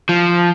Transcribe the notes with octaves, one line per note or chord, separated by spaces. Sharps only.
F3